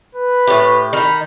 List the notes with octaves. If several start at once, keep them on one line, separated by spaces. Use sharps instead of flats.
B4
A2 G4
D#3 D#4 B5